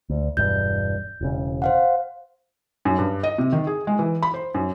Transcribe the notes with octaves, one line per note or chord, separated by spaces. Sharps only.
D2
E1 G2 G6
E1 C#3
C5 F5 F#5
F#2
G2
D#5
C3
D#3
G#4
G#3
E3
B5
C5
F#2